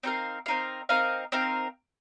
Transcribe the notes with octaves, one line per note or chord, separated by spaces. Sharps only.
C4 D#4 A#4 F5
C4 D#4 A#4 F5
C4 D#4 A#4 F5
C4 D#4 A#4 F5